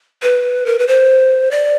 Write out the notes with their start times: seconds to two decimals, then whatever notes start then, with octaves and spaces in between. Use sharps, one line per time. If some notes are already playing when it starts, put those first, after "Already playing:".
0.22 B4
0.66 A#4
0.79 B4
0.87 C5
1.51 D5